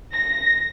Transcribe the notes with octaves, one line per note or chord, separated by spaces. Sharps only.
A#6